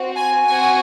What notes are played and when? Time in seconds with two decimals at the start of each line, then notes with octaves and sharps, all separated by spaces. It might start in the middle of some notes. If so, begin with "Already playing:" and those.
Already playing: C4 F#4
0.15 G#5
0.46 C4 F#4 G#5